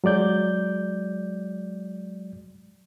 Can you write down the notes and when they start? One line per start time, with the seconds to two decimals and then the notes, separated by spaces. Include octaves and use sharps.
0.04 F#3 G#3 D5 G6